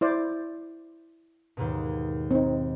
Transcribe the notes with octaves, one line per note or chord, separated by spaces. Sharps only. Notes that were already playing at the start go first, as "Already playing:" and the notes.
E4 C5 D5
D#2 G#2 B2
C4 D#4